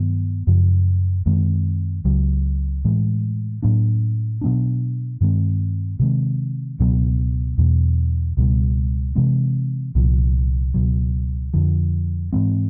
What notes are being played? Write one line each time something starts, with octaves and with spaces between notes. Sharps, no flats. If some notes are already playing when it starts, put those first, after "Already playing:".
Already playing: G2 D#3 F#3 B3
F#2 C#3 F3
F#2 D#3 G#3 C4
C#2 C#3 F#3
A2 E3 G#3
A2 F#3 A#3 D4
B2 F#3 B3 D4
G2 D#3 G#3 C4
C3 D#3 G#3 C4
C#2 B2 F#3 B3
E2 B2 F#3
C#2 B2 G3
C3 E3 G#3 C4
C2 A#2 F3
C#2 B2 F#3
F2 D3 F3
G#2 E3 G#3 C4